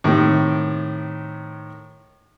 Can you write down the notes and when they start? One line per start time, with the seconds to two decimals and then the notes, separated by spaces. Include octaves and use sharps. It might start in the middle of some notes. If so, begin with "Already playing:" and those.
0.04 A2 C3 D#3